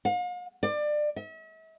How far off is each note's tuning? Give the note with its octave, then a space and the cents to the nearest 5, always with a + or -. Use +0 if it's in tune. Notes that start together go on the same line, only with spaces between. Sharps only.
F5 +45
D5 +25
E5 -40